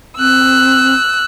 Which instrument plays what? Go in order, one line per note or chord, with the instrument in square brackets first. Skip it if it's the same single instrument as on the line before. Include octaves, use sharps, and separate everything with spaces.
[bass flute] C4 [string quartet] E6 F#6